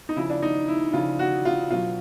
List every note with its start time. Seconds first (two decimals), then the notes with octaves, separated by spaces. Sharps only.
0.09 D#4
0.16 C#3 F3 E4
0.30 D4
0.42 D#4
0.68 E4
0.93 C#3 F3 F4
1.19 F#4
1.45 F4
1.70 B2 F#3 F4